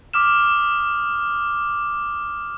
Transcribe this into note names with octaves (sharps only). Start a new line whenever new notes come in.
D6 D#6 F6 E7